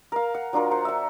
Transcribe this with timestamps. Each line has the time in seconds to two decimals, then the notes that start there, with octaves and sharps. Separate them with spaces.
0.12 A#4 F5
0.35 F#5
0.53 F#3 D4 F4 A#4
0.71 C5 F#5
0.85 E5 F#5